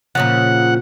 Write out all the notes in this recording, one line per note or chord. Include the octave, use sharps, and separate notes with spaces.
A#2 C#3 F3 F#5